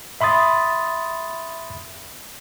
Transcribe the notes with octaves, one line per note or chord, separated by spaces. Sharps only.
E5 B5 C6 D#6 A6